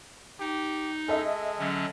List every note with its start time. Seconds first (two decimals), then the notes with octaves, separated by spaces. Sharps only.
0.40 D#4 G4
1.08 G#3 A4 D#5 E5
1.59 D3 F#3 C#4